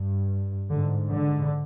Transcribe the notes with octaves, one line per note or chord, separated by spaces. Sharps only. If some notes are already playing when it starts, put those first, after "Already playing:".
Already playing: G2
G#2 D3
D3